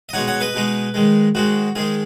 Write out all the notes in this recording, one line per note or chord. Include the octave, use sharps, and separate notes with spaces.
D#5
B2 G#3 D#4 C#5 F#5
C#5 F#5
B4 D#5
B2 G#3 D#4
G#2 D#3 G#3
G#2 D#3 G#3 F#4
G#2 D#3 G#3 G#4